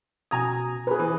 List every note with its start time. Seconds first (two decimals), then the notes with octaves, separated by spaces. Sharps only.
0.31 B2 F#4 G#5 A#5 D#6 G#6
0.87 G#4 B4 C5 A#5
0.99 E3